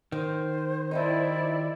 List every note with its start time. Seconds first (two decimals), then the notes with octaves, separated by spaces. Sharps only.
0.12 D#3 C5
0.91 F3 G3 D#4 E4 D5